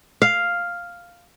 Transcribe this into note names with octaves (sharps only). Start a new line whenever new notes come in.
F5